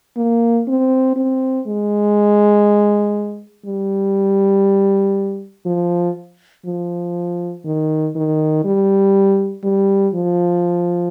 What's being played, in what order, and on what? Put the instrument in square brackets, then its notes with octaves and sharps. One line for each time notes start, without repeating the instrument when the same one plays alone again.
[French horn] A#3
C4
C4
G#3
G3
F3
F3
D#3
D#3
G3
G3
F3